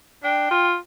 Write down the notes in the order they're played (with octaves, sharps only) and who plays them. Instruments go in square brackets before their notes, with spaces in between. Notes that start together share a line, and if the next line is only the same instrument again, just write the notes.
[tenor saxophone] D4 [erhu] G5
[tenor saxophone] F4